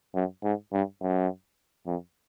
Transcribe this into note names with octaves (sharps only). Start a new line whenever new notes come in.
F#2
G#2
G2
F#2
F2